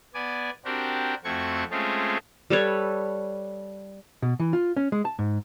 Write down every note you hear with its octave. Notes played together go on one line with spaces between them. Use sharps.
B3 D5 G#5
C4 D4 F#4 G4 A#4
F2 A3 C4 F#4 C#6 G#6
G#3 A3 C4 C#4 F4 G#4
G3 A4 B4 C#5
B2
E3
F4
C#4
G#3
A5
G#2